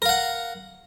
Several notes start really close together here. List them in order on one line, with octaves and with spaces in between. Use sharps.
A#4 F5 F#5